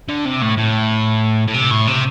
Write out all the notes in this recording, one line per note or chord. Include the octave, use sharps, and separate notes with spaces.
D3
C3
A2
A2
A2
C3
A2
C3